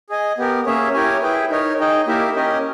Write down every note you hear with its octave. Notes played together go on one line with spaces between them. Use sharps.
G#4 D#5 G#5
B3 G4 A#4
A#3 C#4 G#4 C#5 E5
E4 G4 A#4 C#5 G#5
E4 G#4 B4 G5
D#4 A#4 C#5
D#4 G#4 D#5 G5
A#3 E4 G4 A#4 E5
C#4 G4 A#4 D#5